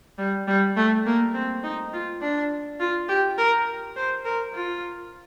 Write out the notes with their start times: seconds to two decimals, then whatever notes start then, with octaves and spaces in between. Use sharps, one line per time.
0.18 G3
0.48 G3
0.77 A3
1.06 A#3
1.34 C4
1.64 D#4
1.93 F4
2.22 D4
2.80 F4
3.09 G4
3.38 A#4
3.96 C5
4.25 A#4
4.55 F4